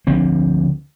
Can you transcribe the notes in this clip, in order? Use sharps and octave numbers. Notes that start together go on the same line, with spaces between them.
D2 D3 F3 C4